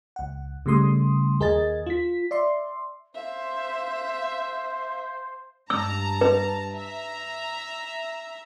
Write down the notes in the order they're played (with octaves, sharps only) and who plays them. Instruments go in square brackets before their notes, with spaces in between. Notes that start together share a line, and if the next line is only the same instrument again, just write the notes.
[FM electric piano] C#2 F#5
C#3 G3 A3 C6 D#6
D#2 G#4 A#4 D#5 G#5 A6
F4 B6
D5 E5 C6
[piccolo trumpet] C5 [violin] E5 [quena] F5
[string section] G2 A5 A#5 [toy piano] E6
[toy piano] B4
[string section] E5 A#5